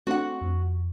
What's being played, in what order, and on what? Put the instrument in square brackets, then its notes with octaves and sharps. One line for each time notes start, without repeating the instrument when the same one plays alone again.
[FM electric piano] A3 C4 D4 [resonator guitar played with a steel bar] F#4 F#5
[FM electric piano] F2